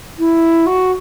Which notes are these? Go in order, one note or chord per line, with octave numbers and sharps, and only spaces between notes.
E4
F#4